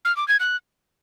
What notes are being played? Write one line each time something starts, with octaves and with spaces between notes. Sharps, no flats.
F6
D6
G#6
F#6